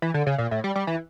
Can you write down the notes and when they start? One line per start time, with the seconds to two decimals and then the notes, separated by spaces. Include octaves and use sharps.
0.02 E3
0.14 D3
0.26 C#3
0.38 A#2
0.51 A2
0.64 G3
0.76 G3
0.87 E3